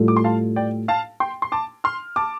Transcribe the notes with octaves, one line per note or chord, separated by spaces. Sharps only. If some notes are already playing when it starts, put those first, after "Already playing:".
Already playing: A2 G3 F4 A4
D6
C6
F5 A5
D5 G5
F5 A5
G5 C6
C6
A5 D6
C6 F6
A5 D6